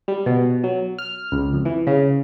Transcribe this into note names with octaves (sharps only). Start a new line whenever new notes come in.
G3
B2
F#3
F6
C#2
F2
E3
C#3